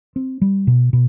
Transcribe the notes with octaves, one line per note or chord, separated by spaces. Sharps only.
C4
G3
B2
B2